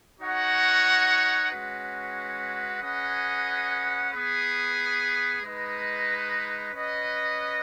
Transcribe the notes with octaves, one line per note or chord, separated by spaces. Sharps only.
D#4 F#4 C#5 F#5
G#3 C#4 F#4 B4 F#5
C#4 G#4 B4 D#5 F#5
B3 G#4 B4
G#3 D#4 B4 D#5
C#4 B4 D#5 F#5